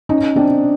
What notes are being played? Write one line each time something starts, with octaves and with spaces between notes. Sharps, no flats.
C#4 D#4
C4 D4